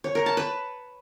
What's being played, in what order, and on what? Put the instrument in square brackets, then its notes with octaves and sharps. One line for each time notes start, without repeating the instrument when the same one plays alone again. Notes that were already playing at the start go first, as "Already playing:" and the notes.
[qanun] C#5
A#4
A5
B4